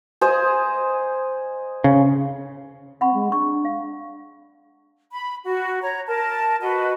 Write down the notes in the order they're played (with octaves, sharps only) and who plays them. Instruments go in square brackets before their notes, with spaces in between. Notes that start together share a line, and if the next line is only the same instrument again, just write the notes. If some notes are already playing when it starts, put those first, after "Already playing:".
[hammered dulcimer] G#4 C5 D#5
[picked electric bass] C#3
[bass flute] C4 [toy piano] F#5 B5 C#6
[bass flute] G#3
[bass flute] D4 [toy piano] C#6
[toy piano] F5
[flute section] B5
F#4
C#5 A#5
A#4 A5
F#4 B4 D#5